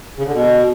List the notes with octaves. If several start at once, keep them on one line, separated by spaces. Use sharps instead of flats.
C#3
D3
B2